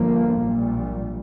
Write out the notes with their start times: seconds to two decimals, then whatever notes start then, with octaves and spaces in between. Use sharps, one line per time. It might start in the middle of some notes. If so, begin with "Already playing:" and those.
Already playing: G1 G2 F3 A#3
0.44 A#1 A#2 G3